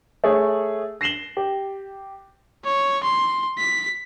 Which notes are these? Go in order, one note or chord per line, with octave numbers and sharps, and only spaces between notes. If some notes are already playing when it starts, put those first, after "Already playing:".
A3 G#4 C#5
A#6 C7 E7 F#7 G7
G4
C#5
C6
B6